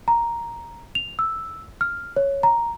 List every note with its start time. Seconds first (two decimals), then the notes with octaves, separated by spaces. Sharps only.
0.08 A#5
0.95 F7
1.19 E6
1.81 F6
2.16 C#5
2.43 A#5